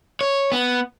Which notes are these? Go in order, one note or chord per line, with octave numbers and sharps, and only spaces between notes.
C#5
B3